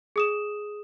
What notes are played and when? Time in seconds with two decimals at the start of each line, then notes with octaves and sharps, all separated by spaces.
0.16 G#4 D#6 E7